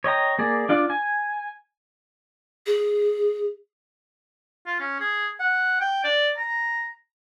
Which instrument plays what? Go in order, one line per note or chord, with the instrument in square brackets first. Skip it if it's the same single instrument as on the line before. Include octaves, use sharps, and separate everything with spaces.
[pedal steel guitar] C#5 D#5 G5 A#5
A#3 G#4 D5
D4 F4 D5
G#5
[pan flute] G#4
[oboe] F4
C#4
G#4
F#5
G5
D5
A#5